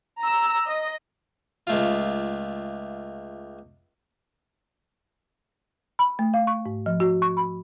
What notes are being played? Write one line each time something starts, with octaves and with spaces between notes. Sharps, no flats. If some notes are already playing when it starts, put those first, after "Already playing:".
A#5 E6
D#5
C#2 A3 F4
B5
A3
F5
C#6
G#2
F3
F#4
C#6
B5